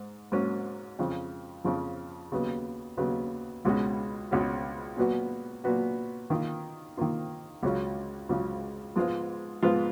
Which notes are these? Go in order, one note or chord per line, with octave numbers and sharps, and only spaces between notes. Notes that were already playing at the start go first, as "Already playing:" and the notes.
Already playing: G#2
G#2 F#3 A#3 C#4
F2 C#3 F3
F2 C#3 F3
D#2 C#3 F#3 B3
D#2 C#3 F#3 B3
C#2 B2 G#3 C#4 F#4
C#2 B2 G#3 C#4 F#4
A#2 F#3 B3 F#4
A#2 F#3 B3 F#4
D#3 A#3 F4
D#3 A#3 F4
C#2 C#3 F#3 C#4 F4
C#2 C#3 F#3 C#4 F4
G#2 F3 G#3 B3 F4
G#2 F3 G#3 B3 F4